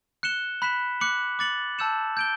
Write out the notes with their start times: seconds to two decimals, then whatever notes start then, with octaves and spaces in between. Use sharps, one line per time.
0.23 F#6 C#7 E7 G7
0.62 B5 F#6 B6 E7
1.01 D6 F#6 C#7 F#7
1.39 D6 A6 C#7 F#7
1.78 A5 E6 G6 C#7 E7
2.17 G6 D7 G7